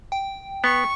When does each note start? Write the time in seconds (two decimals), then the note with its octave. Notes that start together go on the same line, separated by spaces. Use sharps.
0.12 G5
0.64 B3 C#6